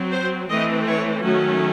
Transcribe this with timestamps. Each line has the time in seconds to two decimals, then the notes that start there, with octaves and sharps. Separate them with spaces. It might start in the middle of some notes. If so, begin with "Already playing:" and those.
Already playing: F#3 C4
0.12 C5
0.49 E3 A3 C4 D#5
0.86 C#5
1.23 D#3 F#3 A3 C#4 F#4